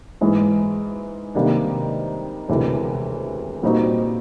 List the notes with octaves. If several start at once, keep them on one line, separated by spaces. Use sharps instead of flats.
G#2 E3 G#3
C3 D#3 G3 A#3 D4
E1 D2 C3 E3
A#2 G3 C4 D#4 F#4